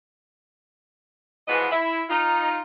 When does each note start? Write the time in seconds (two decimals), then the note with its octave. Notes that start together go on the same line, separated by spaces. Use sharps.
1.48 E3 F3 G#3 B3 F#4 D#5
1.71 E4
2.09 D#4 F4